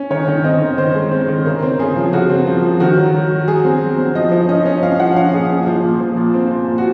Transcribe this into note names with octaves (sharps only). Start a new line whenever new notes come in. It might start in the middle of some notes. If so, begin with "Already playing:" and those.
Already playing: C#4
D#3 C#5
D#3
C4 D#5
D#3
D#3 C5
G#3
C4
D#3
C#3 A#4
C4
C#3 G#4
F3
C#3 F#4
C4
F3
F3
D#3 F#4
F#3
F#3
F#3
F#3 G#4
C4
F#3
C4
F3 D#5
F3
C#4 D#5
C#4
F3 F5
F3 F#5
C#4 F5
A#2 G#4
F3
F3
A#2
F3
A#2
C4
A#2
A#2
F#4